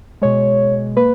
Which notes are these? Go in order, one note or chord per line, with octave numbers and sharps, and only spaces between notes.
B2 G#3 C#5
A#3 B4